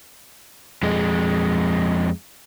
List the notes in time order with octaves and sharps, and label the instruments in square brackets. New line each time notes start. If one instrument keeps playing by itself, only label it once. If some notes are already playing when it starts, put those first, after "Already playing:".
[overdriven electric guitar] F2 G#3